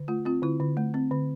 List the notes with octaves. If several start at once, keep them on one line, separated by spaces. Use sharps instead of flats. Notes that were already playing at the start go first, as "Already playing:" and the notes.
Already playing: D3
A3 F4
C4 F4
D3 E4
D3
A3
C4
D3